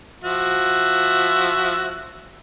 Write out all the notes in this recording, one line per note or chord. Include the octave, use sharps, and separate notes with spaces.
F3 F#4 E5